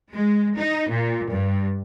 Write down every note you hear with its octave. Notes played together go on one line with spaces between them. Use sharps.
G#3
D#4
A#2
G2